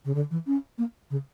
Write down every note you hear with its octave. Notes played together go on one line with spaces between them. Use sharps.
C#3
D3
E3
C#4
A#3
C#3